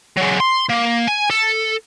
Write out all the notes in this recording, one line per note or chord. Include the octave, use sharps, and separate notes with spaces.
F#3 G#3
C6
A#3
G#5
A4